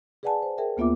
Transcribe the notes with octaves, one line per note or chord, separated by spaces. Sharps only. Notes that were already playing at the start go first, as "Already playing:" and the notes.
G#4 B4 D5 F#5 G#5 A5
C5
G#4 A#4 E5 G5
D2 A#3 B3 F4 E5 D6